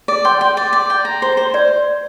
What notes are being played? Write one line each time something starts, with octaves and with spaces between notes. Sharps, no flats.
D5
G5 C6
G5
D5
D5
G5
A#5
C5
C5
C5 D5